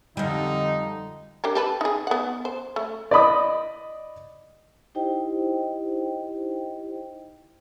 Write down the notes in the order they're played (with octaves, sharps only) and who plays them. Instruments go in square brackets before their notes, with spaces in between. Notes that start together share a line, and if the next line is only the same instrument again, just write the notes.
[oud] F2 G3 [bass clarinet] D3 [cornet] D#4
[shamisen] D4 G4 A#4
G4 A4 B4
D#4 G#4
B3 F#5
C5
A3
[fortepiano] D5 D#5 B5 D#6
[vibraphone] D#4 E4 G4 C5 D#5 G5